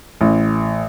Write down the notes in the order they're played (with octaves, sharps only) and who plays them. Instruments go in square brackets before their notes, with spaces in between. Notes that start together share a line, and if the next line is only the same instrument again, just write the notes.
[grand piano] A1